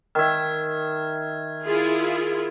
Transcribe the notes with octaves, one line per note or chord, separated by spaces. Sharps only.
D#3 E5 F6 G#6
E4 F4 G#4